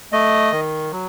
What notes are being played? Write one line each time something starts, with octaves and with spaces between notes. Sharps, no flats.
A3 D#5
D#3
F#3